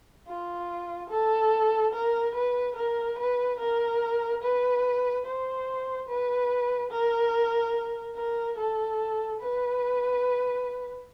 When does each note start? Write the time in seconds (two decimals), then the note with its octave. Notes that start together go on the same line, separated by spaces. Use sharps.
0.28 F4
1.10 A4
1.93 A#4
2.35 B4
2.76 A#4
3.18 B4
3.60 A#4
4.43 B4
5.25 C5
6.08 B4
6.91 A#4
8.15 A#4
8.58 A4
9.41 B4